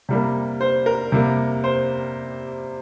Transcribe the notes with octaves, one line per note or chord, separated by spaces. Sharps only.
C3 G3 A#3
C5
A#4
C3 G3 A#3
C5